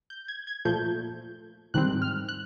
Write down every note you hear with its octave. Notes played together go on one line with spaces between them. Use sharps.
G6
G#6
G#6
A#2 F3 A3 G6
G#2 D#3 G3 C4 F#6
F6
F#6